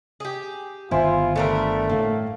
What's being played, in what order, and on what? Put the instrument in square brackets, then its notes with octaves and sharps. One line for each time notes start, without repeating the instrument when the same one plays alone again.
[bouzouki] G4 G#4
[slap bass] G1 D#3 B3 [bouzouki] E4 [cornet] F4 [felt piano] C5 G#5 C6
[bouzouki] D3 G3 A#4 [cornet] A3
[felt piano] A2 F5 [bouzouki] A#3